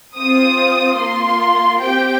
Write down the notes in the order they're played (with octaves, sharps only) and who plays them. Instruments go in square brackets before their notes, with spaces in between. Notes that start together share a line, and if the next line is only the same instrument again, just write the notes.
[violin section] C4 F4 D#6
A#3 F4 C6
C4 G4 G5